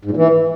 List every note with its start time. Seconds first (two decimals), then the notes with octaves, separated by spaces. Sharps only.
0.05 G#2
0.11 A#2
0.17 E3